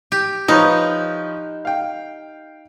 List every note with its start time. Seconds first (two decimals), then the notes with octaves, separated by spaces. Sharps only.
0.12 G4
0.48 F3 D#4 B4 C#5
1.65 F5 G5